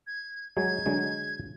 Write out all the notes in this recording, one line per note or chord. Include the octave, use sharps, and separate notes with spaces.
G#6
F#3 G#3 G#6
D3 F#3 G#3